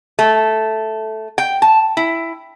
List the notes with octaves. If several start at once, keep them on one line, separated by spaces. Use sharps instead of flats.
A3
G5
A5
E4